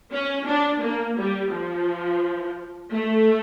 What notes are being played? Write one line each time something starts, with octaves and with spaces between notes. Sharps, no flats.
C#4
D4
A#3
G3
F3
A3